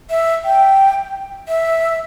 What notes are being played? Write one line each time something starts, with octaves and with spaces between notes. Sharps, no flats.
E5
G5
E5